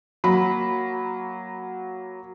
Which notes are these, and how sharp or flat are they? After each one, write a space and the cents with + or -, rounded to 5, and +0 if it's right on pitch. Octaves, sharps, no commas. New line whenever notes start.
F#3 +0 A#3 +0 B5 +0